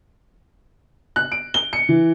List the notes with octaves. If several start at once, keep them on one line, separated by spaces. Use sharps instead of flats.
F#6
D7
G7
C#7
E3